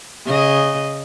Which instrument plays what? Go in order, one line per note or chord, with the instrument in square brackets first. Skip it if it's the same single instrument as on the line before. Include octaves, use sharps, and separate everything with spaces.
[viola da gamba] C#3 D#5